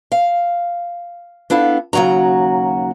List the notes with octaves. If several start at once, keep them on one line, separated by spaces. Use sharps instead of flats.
F5
B3 D4 E4 A4 F5
D#2 C#3 F#3 F#4 A#5